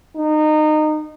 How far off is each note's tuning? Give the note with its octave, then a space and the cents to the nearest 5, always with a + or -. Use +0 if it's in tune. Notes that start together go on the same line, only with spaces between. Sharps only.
D#4 -25